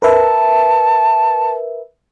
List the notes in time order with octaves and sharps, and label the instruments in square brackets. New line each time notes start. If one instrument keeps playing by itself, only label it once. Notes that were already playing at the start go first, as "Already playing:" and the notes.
[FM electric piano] A#4 B4 E5 [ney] A5